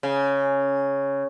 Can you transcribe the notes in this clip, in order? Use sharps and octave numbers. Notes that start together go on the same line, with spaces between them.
C#3